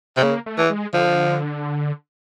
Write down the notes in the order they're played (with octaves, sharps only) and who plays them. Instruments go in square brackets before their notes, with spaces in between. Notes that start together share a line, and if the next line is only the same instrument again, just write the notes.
[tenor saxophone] C3
[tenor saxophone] C#3 [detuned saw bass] A#3
[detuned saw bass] A3
[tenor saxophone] E3
[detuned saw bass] G#3
[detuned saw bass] D3 [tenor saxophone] F3